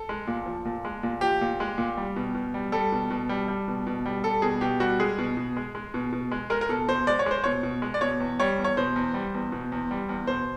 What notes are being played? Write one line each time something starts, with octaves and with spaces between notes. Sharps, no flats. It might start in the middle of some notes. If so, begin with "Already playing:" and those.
Already playing: A4
G#3
A#2
F3
A#2
G#3
A#2
F3 G4
A#2
G#3
A#2
G3
B2
B2
G3
G3 A4
B2
B2
G3
G3
B2
B2
G3
G3 A4
B2 G#4
B2 G4
G3 F#4
G#3 G#4
B2
B2
G#3
G#3
B2
B2
G#3
G#3 A#4
A#4
B2 A4
B2 C5
G#3 D5
C#5
G#3 C5
B2 C#5
B2
G#3
D5
B2 C#5
E2
G3 C#5
E2
C#5
B2 C5
E2
G3
E2
B2
E2
G3
E2
B2 C5